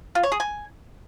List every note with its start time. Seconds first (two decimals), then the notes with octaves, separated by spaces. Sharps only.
0.15 F4
0.23 C#5
0.32 G#4
0.40 G#5